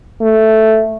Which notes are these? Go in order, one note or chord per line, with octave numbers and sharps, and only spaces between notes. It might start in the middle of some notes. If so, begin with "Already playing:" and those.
A3